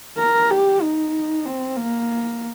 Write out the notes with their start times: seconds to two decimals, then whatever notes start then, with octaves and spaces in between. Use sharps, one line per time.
0.18 A#4
0.51 G4
0.82 D#4
1.45 C4
1.76 A#3